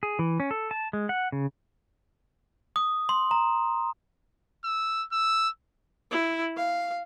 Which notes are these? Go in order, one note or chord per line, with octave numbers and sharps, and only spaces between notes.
G#4
E3
C#4
A4
A5
G#3
F#5
C#3
D#6
C6
A#5
E6
E6
E4
F5